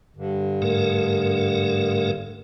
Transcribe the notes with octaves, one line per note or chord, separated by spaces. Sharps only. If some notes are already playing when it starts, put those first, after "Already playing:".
G2 D3
G#2 A3 A#4